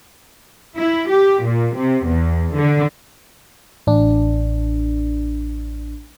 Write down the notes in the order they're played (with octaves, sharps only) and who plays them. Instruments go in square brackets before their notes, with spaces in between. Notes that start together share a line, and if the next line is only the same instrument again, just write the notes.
[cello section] E4
G4
A#2
C3
E2
D3
[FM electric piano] A1 D4